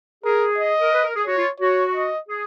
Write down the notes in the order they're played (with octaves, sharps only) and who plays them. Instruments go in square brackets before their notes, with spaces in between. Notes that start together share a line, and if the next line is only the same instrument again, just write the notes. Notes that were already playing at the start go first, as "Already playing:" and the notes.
[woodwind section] G#4 [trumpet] A#4
[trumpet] D#5
[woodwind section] A#4
B4
A#4
G#4
[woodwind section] F#4 [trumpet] C#5
[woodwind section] F4
[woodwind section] F#4 [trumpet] C#5
[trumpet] D#5
[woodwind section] G#4